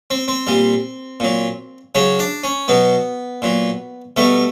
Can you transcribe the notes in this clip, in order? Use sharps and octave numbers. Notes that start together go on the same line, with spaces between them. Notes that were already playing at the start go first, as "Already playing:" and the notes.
C4
C4
A#2 G3
A#2 F#3
C#3 F#3 C#4
D4
C#4
B2 F#3 B3
A#2 F#3
B2 G3 A3